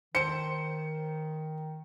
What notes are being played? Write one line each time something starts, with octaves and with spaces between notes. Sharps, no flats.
D#3 A4 C5 C#7